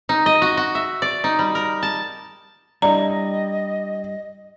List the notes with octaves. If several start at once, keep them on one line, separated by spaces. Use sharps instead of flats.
D#4
D#5
F#4
F#4
E5
D5
D#4
G3
A#4
A5
G3 D4 E4 D5 D#5 A#5